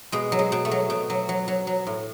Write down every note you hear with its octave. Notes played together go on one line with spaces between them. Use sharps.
B2 G#3
F#3
G#3
B2
A3
F#3
B2
F#3
F#3
F#3
F#3
A2